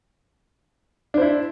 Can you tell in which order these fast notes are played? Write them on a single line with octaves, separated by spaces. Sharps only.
D4 C5 E4